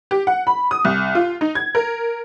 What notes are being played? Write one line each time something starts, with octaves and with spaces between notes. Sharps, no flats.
G4
F#5
B5
D#6
C2
F4
D#4
G#6
A#4